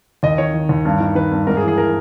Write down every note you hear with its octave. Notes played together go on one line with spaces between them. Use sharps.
D#2 D#5
D#3 C#5
D#3
D#2
G2
D#3
D#3 B4
G2
G#2 A#4
G#4
E3
G#4
E3 A#4